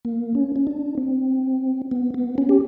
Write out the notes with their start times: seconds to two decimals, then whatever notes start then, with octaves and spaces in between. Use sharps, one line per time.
0.05 A#3
0.35 C#4
0.56 C#4
0.67 D4
0.98 C4
1.91 B3
2.14 B3
2.38 C#4
2.49 G4